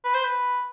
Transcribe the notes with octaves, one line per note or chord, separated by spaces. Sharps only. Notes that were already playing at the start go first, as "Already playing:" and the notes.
B4
C5
B4